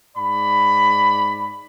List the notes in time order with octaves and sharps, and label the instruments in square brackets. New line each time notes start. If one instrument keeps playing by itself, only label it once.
[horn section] G#2 D5 B5